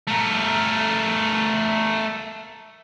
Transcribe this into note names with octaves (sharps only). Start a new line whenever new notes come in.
A3 A#4